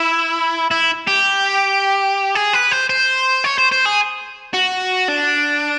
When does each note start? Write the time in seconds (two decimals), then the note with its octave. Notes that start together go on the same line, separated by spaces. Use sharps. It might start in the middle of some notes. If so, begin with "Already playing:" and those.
Already playing: E4
0.71 E4
1.08 G4
2.35 G#4
2.53 B4
2.71 C5
2.90 C5
3.44 C#5
3.58 C5
3.72 C5
3.85 G#4
4.54 F#4
5.08 D4